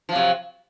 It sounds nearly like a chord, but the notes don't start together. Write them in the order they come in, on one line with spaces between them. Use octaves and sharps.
F3 F#3 C3